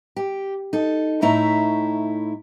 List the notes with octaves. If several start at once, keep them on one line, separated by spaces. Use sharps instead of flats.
G4
D#4 A4
A2 A3 D#4 E4 E5 A#5